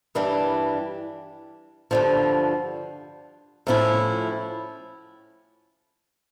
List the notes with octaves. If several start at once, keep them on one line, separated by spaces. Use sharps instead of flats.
G2 E3 G3 D4
G2 D3 F3
A2 F3 C#4 E4